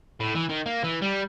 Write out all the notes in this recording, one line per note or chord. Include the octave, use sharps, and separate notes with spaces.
A2
E3
D#3
A#3
E3
G3